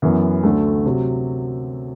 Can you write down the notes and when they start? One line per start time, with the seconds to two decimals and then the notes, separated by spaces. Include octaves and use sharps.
0.02 F#2 E3 B3
0.43 D2 D3 A3
0.86 C3 F#3